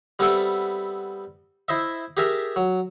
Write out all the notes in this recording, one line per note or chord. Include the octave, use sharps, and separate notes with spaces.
G3 B3 C4 A4 B4 E5
E4 C5 D#5 E5
G4 G#4 A#4 E5 A5
F#3